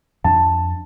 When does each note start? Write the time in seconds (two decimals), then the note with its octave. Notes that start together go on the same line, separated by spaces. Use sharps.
0.24 F2 D4 A5